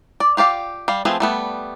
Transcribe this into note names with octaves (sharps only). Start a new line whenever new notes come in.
D5
F4 G4 D5 F5
G3 F5
F3 A3 C4 G#4 B4
G3 A3 B3